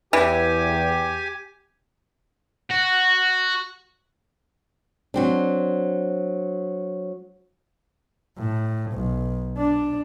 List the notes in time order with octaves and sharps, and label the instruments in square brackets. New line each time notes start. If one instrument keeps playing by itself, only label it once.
[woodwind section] E2 [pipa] E3 [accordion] G4 G#5
[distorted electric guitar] F#4
[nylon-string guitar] F#3 C4 D4
[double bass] A2
B1
D4